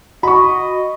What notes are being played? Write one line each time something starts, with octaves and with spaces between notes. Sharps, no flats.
F#4 D#5 B5 C#6